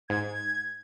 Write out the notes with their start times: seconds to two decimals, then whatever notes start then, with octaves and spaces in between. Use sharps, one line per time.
0.10 G#2 G#6